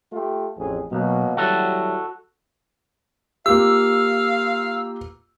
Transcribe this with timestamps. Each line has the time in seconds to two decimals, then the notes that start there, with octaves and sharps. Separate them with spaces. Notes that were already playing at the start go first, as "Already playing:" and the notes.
0.13 A3 F4 G4
0.58 A1 F2 G#4
0.92 B1 B2 F#3 A#3
1.37 F#3 G3 E4 F#4 A4
3.46 A#3 F4 G4 F5 E6